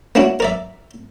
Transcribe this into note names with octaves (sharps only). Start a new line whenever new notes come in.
A#3 C#4 D4 E4 F#4
A#4 D5 E5